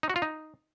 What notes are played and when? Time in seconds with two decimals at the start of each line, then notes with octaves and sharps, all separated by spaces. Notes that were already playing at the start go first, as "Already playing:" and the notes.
0.03 D#4
0.10 F#4
0.16 F4
0.22 D#4